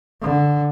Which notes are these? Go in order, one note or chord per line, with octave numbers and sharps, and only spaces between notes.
D3